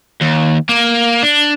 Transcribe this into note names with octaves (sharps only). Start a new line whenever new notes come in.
D#2
A#3
D4